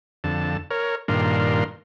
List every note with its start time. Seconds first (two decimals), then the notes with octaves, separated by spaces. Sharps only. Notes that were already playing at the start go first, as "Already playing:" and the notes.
0.24 F2 D3 A5
0.70 A#4 C#5
1.08 G2 A#2 D#3 D4 A#4 C6